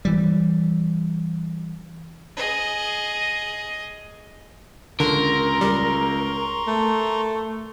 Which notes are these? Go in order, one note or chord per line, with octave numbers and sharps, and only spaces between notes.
E3 G3
G#4 D#5
C#2 D3 A#4 A#5 C6 C#6
G3
A3